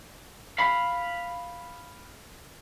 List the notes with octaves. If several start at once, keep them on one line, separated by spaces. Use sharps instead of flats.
F5 B5